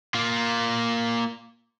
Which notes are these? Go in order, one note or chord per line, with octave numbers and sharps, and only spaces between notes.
A#3 F4